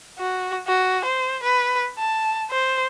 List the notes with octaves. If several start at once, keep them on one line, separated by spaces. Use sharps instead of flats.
F#4
F#4
C5
B4
A5
C5